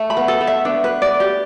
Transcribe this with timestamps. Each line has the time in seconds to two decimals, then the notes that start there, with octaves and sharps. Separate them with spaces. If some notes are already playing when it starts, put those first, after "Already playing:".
Already playing: A3
0.10 B5
0.17 B3
0.28 A4
0.41 A3
0.47 E5
0.65 B3 D4
0.84 B4
1.02 D5
1.20 G4